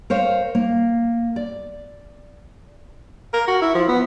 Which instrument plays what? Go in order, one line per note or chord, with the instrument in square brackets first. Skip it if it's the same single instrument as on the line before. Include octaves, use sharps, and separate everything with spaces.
[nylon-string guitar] A#4 C5 C#5 F5
A#3
D5
[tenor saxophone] A#4
F#4
E4
F3
B3